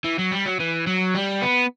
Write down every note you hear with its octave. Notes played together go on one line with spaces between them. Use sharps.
E3
F#3
G3
F#3
E3
F#3
G3
B3